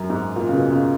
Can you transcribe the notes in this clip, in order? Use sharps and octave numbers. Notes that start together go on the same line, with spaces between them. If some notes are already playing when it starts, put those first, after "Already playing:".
Already playing: F#2
G#2
A#2
C#3
B2
C#3